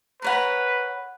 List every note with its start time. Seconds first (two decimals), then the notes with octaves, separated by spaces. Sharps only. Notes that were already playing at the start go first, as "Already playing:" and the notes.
0.22 A#4 B4 C#5 F#5